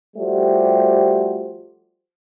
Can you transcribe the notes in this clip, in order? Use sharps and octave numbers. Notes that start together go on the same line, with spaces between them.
F3 G3 A3 F#4 G4 C5